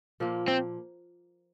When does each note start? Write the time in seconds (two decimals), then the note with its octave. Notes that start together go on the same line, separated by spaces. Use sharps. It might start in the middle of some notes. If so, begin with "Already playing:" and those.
0.20 A#2 F3 A#3
0.48 C4